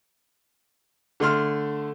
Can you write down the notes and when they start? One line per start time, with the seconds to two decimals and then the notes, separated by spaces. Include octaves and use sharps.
1.20 D3 A3 C6 F6